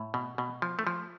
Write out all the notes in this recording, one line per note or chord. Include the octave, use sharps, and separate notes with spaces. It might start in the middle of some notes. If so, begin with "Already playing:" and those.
Already playing: A2
B2
B2
F3
A3
F3